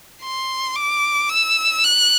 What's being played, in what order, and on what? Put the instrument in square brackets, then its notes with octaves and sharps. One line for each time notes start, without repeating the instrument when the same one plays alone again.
[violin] C6
D6
E6
F#6